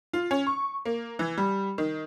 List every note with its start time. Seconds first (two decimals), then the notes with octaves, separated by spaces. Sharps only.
0.13 F4
0.31 C#4
0.47 C#6
0.85 A#3
1.19 E3
1.37 G3
1.78 D#3